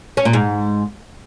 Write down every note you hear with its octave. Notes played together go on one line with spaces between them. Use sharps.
C#4
A#2
G#2